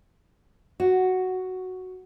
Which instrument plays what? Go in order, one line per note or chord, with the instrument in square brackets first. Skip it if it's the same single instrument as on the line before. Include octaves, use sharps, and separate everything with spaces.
[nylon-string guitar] F#4